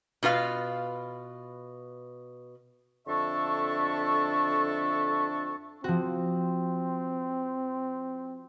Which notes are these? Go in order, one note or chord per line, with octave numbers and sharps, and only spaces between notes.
B2 F4 B4 F5
F2 D3 D4 A4 E5 C#6
F3 C4 F#4